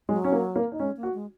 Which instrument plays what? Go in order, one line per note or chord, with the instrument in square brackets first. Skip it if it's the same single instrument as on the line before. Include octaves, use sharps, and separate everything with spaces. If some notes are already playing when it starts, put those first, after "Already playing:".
[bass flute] F#3 [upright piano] G#3
[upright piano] C#4
A#3
A#3
D#4
[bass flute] G#3 [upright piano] C#4
[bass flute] A#3
[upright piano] F#4
[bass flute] G#3